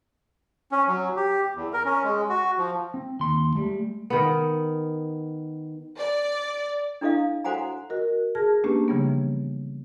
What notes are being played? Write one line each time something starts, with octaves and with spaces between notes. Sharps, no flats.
C#4
F#3
G4
E2
A#4
C#4
G#3
F#4
F3
C4
D#2 C6
G3 A3
D#3 B3
D5
D4 E4 A4 D#5 F5
F#4 A4 C5 F#5 G#5 A#5
F#4 A#4 D#5
G#4 A5 F6 G#6 A#6
A3 A#3 C#4 D4 G4 B4
C#3 E3 F3 G3 A#3 B3